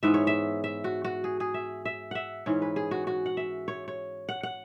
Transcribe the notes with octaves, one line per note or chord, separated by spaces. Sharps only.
G#2 E3 B3 E5
C#5
E5
E5
F#4
F#4
G#4
G#4
E5
E5
E5 F#5
G#2 E3 C#4 C#5
B4
G#4
F#4
F#4
F#5
E5
C#5
C#5
F#5
F#5